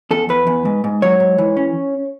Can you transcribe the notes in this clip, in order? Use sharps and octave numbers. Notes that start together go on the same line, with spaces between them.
E2 A4
E2 B4
E2
G#2
G#2
F#3 C#5
G#2
E3
C#4